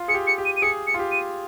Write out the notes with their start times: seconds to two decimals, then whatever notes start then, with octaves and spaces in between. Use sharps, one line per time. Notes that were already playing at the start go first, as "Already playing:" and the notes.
Already playing: F4
0.08 G#4 C#7
0.14 G4
0.27 C#7
0.38 G4
0.45 D#7
0.56 D#7
0.62 G#4 C#7
0.87 C#7
0.94 F4
0.99 G4
1.11 D#7